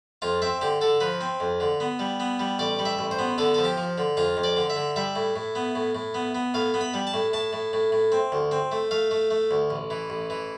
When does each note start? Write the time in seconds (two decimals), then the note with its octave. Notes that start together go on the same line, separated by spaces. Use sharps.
0.22 F2 F4
0.42 C4 E5
0.61 D3 G4
0.81 D3 A4
1.01 F3 B4
1.21 C4
1.40 F2
1.60 D3
1.80 B3
1.99 G3
2.20 B3
2.39 G3
2.59 A1 D5
2.79 G3
2.85 E5
2.99 A1
3.11 C5
3.19 B3
3.38 D3 A4
3.54 F3 A4
3.64 G4
3.77 F3
3.98 D3
4.17 F2 F4
4.37 F2
4.44 D5
4.57 D3
4.70 E5
4.76 D3
4.96 G3 E5
5.16 A2
5.36 A2
5.55 B3
5.76 A2
5.95 A2
6.14 B3
6.35 B3
6.54 A2 F5
6.74 B3
6.81 B5
6.94 G3
7.07 A5
7.14 A2
7.33 A2 A5
7.53 A2
7.73 A2
7.92 A2
8.12 C4
8.32 D2
8.51 C4
8.72 A3
8.91 A3 F5
9.11 A3
9.31 A3
9.51 D2
9.70 A1
9.90 E3
10.10 A1
10.30 E3